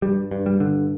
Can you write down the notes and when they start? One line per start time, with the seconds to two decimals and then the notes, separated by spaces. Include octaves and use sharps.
0.02 G2 G3
0.31 G2
0.46 G3
0.60 D3